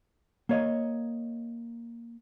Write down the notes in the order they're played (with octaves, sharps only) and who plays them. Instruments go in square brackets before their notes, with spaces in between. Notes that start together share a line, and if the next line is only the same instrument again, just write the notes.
[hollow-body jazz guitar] A#3 C#5 D#5